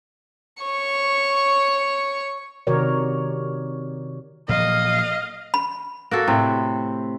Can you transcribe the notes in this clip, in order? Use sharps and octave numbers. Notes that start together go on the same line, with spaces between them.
C#5 C#6
C3 D#3 F#4 A#4 C#5 D5
A#2 F3 F#3 D#5 F5
B5
A#3 F#4 A4
A2 C3